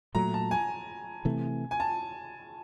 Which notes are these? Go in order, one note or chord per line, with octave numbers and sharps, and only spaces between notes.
A#2 F#3 A3 A#5
A5
G#5
C3 E3 A3
G#5
A5